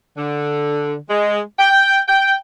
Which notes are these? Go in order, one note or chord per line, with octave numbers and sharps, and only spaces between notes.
D3
G#3
G5
G5